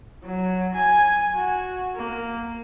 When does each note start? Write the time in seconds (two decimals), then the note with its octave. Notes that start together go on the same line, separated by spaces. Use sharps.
0.24 F#3
0.74 G#5
1.35 F#4
1.95 A#3